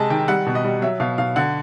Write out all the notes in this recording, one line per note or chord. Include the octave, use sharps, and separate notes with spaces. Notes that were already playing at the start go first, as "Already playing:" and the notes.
Already playing: C3 G#3 G#5 A5
D#3 G5
G3 F#5
B2
D#5
G3
F#3 E5
B2 F5
B2 F5
D3 F#5